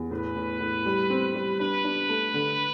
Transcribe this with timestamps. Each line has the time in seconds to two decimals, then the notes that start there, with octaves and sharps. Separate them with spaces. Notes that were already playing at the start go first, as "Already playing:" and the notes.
Already playing: E2
0.11 A2 B4
0.36 A2
0.60 A2
0.86 G3
1.10 C4
1.35 G3
1.60 D4 B4
1.85 D4
2.09 A3
2.34 D3